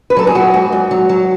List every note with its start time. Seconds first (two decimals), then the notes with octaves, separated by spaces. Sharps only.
0.10 B4
0.16 F#3 A4
0.27 G#4
0.35 F#3 F#4
0.54 G#2 F#4
0.72 G#2
0.91 F#3
1.09 F#3